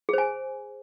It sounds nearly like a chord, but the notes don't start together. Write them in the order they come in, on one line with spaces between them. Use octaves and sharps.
G#4 C5 G#5